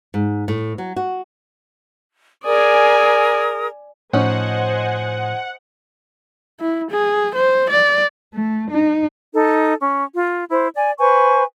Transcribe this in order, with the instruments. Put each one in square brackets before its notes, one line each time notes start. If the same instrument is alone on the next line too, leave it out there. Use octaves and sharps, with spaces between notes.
[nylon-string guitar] G#2
A2
F#3
F#4
[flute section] G#4 A#4 D#6 [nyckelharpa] D5 G#5
[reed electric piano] A2 [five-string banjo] F3 C#4 D#4 [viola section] C5 D#5 G#5 [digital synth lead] F#5
[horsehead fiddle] E4
G#4
C5
D5
[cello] A3
D#4
[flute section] D#4 A4
C#4
F4
E4 C5
D5 G#5
B4 C5 G#5 C#6